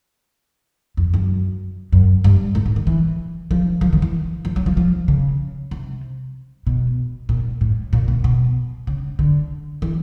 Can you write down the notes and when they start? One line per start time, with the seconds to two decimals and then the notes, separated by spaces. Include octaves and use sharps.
0.97 F2
1.14 F#2
1.92 F#2
2.24 G2
2.55 G#2
2.66 A2
2.76 D#3
2.87 E3
3.51 F3
3.81 F3
3.93 D#3
4.02 E3
4.45 F3
4.56 F#3
4.66 F3
4.77 F3
5.08 C#3
5.71 C3
6.67 B2
7.29 A#2
7.61 A2
7.93 A#2
8.08 B2
8.24 B2
8.87 C#3
9.19 D3
9.82 E3